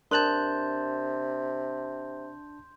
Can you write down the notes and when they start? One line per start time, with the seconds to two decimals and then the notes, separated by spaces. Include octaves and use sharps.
0.11 C3 D4 A#4 A5 C6 F#6 G6 F#7